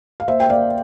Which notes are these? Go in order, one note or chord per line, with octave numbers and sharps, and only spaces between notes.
F5
A#3 C5 E5
G5
A#3 D5 F5